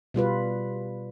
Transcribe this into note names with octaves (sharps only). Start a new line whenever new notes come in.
B2 G3 F4 B4